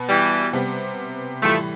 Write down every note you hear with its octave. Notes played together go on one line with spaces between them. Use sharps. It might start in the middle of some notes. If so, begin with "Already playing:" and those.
Already playing: B2 B3
E3 G3
C3 G3 B3
A2 E3 F3 G3 A3